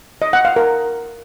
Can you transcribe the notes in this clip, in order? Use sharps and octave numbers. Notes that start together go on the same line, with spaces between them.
D#5
F#5
F5
A#4